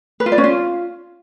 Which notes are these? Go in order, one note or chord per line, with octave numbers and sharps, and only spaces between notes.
B4
F4
D5
C#4
F4